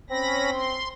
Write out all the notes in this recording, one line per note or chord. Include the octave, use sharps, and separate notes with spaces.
C4 C#4 B5 A#6
C6